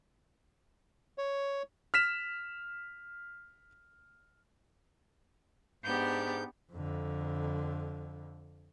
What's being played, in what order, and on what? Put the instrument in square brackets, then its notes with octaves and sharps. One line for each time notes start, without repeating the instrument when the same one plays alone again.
[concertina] C#5
[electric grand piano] F6 B6 E7
[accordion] G#2 G6 [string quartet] B3 D4 G4
[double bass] F2 D3